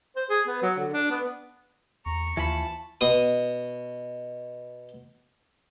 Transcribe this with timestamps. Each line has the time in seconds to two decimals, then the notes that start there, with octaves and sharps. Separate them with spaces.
0.16 C5
0.30 G#4
0.48 B3
0.62 F#3
0.79 D3
0.94 D4
1.11 B3
2.06 E2 A#5 C#6
2.37 D#2 E3 F3 A5 B5
3.01 B2 D#6